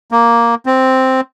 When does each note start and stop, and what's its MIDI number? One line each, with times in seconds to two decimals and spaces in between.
0.12 0.55 58
0.66 1.21 60